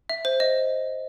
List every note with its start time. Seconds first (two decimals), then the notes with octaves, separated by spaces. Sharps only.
0.09 E5
0.25 C5
0.40 D#5